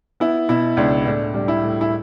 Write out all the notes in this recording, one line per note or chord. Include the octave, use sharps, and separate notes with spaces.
B3 E4
B2 E4
C#2 D4
A2 D4
G3
E4
A2
E4